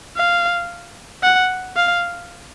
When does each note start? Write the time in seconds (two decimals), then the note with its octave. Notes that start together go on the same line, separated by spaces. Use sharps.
0.17 F5
1.23 F#5
1.76 F5